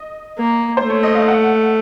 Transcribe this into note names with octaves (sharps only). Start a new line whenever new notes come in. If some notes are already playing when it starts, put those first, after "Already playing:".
Already playing: D#5
A#3
C5
A3
C#5
D#5
F5
F#5